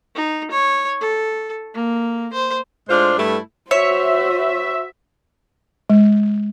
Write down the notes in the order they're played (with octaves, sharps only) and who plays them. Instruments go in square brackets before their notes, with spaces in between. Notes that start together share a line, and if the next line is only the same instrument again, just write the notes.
[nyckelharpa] D#4
C#5
A4
A#3
C5
[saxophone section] A2 G#3 D4 F4 C5
G2 G3 A3 E4 A4 E5
[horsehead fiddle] F#4 C5 [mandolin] C#5 [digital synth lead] E5
[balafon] G#3